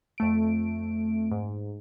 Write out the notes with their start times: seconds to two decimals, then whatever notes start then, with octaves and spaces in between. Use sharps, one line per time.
0.18 F2 A3 D7
1.32 G#2